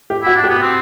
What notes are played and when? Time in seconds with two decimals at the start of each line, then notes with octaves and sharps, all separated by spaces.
0.10 G4
0.23 E4 F#4
0.36 D4
0.44 G4
0.49 B3
0.62 C4